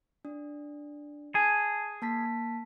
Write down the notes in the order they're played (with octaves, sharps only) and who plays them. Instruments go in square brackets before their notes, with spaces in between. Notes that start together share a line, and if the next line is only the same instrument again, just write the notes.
[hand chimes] D4
[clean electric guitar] G#4 [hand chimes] A5
[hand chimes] A#3 A5 B6